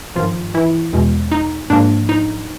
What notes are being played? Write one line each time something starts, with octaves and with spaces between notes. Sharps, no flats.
G#1 G2 D#3 F3 F4
E3 E4
E2 B2 G#3
D#4
G#2 F3 A#3 D4
D#4